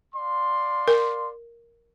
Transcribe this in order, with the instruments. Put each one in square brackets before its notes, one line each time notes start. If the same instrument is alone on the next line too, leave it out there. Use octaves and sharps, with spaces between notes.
[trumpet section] D5 F5 C6
[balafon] A#4